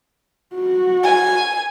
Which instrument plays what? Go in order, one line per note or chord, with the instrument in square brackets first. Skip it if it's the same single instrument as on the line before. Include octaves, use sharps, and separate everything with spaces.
[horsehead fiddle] F#4
[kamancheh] G#5